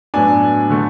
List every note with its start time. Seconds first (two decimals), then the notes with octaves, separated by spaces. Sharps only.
0.14 A2 F#3 B3 D4 G#5
0.70 D3 A3